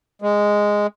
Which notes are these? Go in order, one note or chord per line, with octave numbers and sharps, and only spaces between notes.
G#3